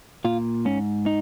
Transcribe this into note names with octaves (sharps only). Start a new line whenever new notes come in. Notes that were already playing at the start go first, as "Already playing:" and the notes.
A#2 F4
G#2 C#4
D#4